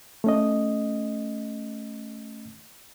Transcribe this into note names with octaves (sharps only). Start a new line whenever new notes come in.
A3 C#4 D#5